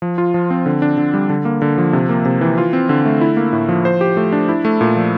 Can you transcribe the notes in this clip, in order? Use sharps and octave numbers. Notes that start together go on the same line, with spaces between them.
F3
F4
F3
C4
D3
D4
D3
G3
D3
A#3
D3
F3
C3
A#3
C3
E3
F4
C4
D3
A3
E4
A#3
A2
F3
C5
G4
A3
D4
E4
A3
A#2
F3